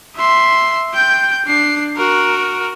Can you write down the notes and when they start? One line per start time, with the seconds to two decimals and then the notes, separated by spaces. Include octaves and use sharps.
0.16 E5 C6
0.93 G5 G6
1.46 D4 C7
1.96 F#4 A#4